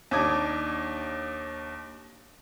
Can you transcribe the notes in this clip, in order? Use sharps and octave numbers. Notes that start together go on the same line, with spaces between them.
D#2 D4 D#4 D6 D#6 G#6